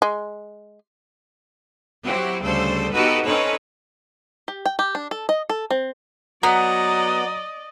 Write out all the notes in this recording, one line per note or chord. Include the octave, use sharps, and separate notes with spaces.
G#3
F#3 C4 E4 F#4 G4
D2 C#3 G3 A4 C5
B3 D#4 F#4 G4 A4 B4
C4 C#4 D#4 A4 B4 C#5
G4
G5
G4
D4
A4
D#5
A4
C4
F#3 B3 D5 D#5 A#5